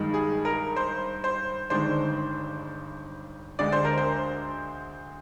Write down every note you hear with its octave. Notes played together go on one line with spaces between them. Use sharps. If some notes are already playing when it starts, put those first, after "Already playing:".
Already playing: G2 D#3 G#3
G#4
A#4
C5
C5
G1 G2 D#3 G#3 D4 C5
D2 D3 G#3 D5
C5
A#4
C5